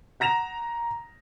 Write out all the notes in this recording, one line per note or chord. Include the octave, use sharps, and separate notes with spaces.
F#5 A#5 A#6 E7 F7